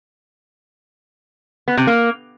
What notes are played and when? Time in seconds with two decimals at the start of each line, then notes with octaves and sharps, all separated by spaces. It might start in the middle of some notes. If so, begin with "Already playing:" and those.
1.68 B3
1.77 C3
1.87 A#3